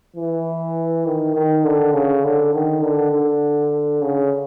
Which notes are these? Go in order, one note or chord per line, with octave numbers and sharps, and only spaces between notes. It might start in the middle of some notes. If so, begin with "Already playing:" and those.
E3
D#3
D#3
D3
C#3
D3
D#3
D3
D3
C#3